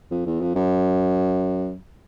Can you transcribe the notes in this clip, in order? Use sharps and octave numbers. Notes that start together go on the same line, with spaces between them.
F2
E2
F2
F#2